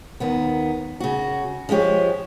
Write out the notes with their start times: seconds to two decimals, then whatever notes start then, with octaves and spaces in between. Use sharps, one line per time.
0.20 D#2 D#3 B3
1.00 C#3 F#4
1.69 F3 G#3 E4 G4 C#5